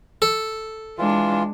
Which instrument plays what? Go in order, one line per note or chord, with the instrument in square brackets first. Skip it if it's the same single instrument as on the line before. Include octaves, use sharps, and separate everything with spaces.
[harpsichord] A4
[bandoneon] E3 F4 [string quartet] G#3 D4